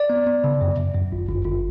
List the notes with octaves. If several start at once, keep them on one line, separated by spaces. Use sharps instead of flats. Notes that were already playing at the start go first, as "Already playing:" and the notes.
Already playing: D5
B3
B3
C#3
F#2
F#2
F#2
G1
G1
G1